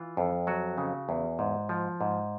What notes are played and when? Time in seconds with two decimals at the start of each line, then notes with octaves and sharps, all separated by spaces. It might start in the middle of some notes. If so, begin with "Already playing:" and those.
Already playing: E3 F4
0.17 F2
0.47 F#3 F#4
0.78 C#3
1.09 E2
1.39 G#2
1.69 F3
2.01 G#2